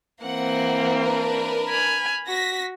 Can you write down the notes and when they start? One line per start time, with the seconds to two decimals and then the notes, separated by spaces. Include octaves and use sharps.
0.23 E3 A#3 C4 F#5
1.00 D4 A#4 B4
1.69 G#5 B5 F6
2.27 F#4 A#6 B6